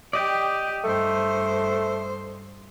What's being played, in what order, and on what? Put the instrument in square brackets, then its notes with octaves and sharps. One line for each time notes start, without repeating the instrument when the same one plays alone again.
[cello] G4 [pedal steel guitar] D5 D#5 G5
[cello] G2 C5 [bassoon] A3